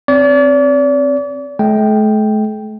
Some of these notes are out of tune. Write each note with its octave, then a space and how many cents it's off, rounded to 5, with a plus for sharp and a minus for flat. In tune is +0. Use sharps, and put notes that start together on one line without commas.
C4 +0 D5 -40
A3 -45 G5 +0